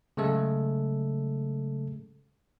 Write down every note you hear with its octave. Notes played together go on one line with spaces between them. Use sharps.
C#3 F#3 G#3 A3 A4